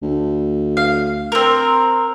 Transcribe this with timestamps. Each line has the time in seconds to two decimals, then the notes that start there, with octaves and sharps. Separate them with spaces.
0.02 D2
0.77 F5
1.32 C4 A#4